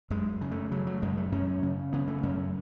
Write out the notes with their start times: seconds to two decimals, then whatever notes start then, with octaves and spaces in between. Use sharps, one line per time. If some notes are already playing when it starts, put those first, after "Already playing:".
0.10 F#2 G#3
0.41 C#3
0.51 A3
0.71 C#3 F#3
0.87 F#3
1.02 F#2 G#3
1.17 A3
1.32 F#2 C#4
1.63 C#3
1.93 C#3 B3
2.07 A3
2.23 F#2 C#4